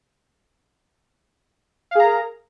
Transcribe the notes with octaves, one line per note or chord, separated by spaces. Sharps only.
G#4 A#4 F5 A#5